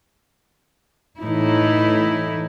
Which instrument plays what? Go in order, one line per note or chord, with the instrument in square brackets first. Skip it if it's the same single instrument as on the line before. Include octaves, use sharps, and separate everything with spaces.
[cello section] A2 E3 D#4 E4